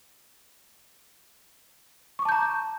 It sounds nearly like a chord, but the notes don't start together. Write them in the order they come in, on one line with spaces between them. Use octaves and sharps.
C#6 D6 A5 G6 A#5